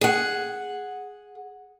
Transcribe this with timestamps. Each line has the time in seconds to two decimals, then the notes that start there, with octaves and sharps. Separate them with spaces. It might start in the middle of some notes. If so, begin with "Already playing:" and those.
0.01 G#4 F#5